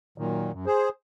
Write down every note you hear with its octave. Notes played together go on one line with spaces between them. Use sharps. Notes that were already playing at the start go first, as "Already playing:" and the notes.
F#2 A#2 D#3
F#2
G#4 C5